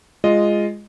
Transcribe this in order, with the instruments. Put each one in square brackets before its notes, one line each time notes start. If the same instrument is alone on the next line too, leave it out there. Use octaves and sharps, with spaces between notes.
[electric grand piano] G#3 F4 D#5